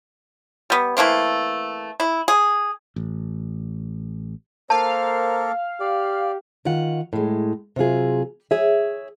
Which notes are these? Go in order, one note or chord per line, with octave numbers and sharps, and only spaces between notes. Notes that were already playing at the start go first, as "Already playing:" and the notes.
G3 B3
E3 A3 A#3 C4
E4
G#4
A1
A#3 A4 A#4 C5 F5 A5
G4 D5
D#3 F4 F#5
A2 G#3
C3 F#3 F4 G#4
G#4 C#5 E5